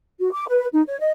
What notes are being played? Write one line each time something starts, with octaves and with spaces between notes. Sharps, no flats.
F#4
D6
B4
D#4
C#5
D#5